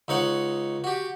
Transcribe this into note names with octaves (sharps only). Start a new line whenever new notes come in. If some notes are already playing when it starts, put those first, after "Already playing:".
C#2 D#4 C#5 F#5
F#4 G4